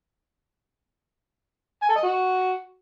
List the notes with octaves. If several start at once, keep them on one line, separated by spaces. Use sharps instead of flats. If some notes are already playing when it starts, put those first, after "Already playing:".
G#5
A4
D#5
F#4